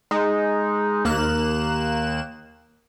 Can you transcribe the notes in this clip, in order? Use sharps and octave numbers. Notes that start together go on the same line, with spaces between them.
G#3 D#4
D#2 A#3 F#6 E7